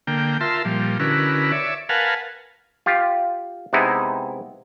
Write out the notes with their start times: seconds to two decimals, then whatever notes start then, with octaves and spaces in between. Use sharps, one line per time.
0.07 D3 A#3 G5
0.41 F4 A#4 E5 A5 C6
0.65 A#2 F3 G3
1.00 D3 C#4 E4 F#4 A#4 B4
1.52 C#5 D5 E5
1.89 A#4 B4 F5 F#5 G#5 A5
2.86 F4 G4
3.73 C3 G#3 B3 D#4 E4